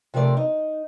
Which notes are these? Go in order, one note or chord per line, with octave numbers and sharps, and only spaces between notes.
C3 F3 A3 A#4 D5
D#4